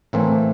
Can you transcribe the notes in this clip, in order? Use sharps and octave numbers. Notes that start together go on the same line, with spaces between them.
A2 E3 A3 A#3 C4